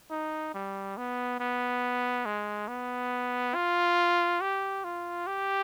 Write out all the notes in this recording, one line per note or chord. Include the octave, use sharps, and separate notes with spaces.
D#4
G3
B3
B3
G#3
B3
F4
G4
F4
G4